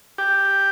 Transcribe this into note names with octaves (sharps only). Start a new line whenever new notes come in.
G4